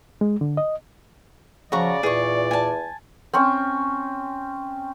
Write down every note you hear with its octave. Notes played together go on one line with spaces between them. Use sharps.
G#3
D3
D#5
C#3 F3 F#4 D5 A#5 C#6
E2 A#2 G#4 C#6
G#5 A5
C4 C#4 C#6